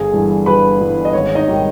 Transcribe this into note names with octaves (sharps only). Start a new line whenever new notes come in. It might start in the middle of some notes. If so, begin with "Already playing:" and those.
Already playing: G1 G#4
G2 E3
G1 B4 B5
G2 E3
D#5
G#1 C#5
D#4 D#5
D#3 G3